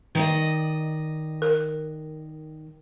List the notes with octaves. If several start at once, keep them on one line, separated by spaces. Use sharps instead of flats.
D#3 D5 D#5
A#4